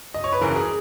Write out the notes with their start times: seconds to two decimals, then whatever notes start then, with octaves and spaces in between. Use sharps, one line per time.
0.14 D#5
0.24 C#5
0.33 B4
0.41 F#1 E2 C#3 E3 A#4
0.56 G#4